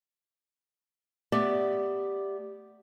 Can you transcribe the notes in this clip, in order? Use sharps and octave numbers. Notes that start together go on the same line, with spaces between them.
A3 B3 G4 D5 E5